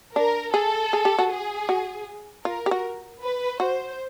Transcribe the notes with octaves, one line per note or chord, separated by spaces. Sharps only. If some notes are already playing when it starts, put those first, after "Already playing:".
D4 A#4
G#4 A4
G#4
G4
F#4
G#4
F#4
F4 A#4
G4
F#4
B4
F#4 C5